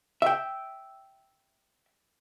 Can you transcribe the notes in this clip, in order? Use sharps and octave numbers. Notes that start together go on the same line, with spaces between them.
E5 G5